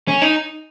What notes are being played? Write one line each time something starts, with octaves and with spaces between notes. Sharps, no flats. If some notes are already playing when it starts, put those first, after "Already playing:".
C#4
D#4